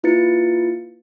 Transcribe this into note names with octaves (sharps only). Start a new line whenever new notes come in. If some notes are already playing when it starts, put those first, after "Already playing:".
A#3 E4 F4 B4 A6 C#7